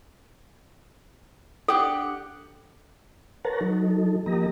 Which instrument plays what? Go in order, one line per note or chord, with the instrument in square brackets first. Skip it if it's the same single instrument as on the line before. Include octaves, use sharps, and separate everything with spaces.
[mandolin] D4 G4 F#5 [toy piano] A4
[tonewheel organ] A#4 B4 C#5 F#5 A5 A#5
F#3 D#4 A4
F3 A#3 G4 D#5 A#5